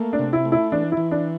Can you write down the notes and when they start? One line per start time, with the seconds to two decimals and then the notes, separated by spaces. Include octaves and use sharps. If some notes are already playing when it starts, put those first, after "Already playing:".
Already playing: A3 A#3
0.13 D4
0.19 C3
0.33 E4
0.45 A3
0.52 E4
0.72 E3 D4
0.92 E4
0.97 E3
1.11 D4